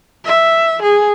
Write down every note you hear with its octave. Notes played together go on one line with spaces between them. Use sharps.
E5
G#4